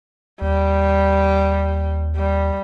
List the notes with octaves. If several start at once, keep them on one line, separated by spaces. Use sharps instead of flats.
D#2 G3
G3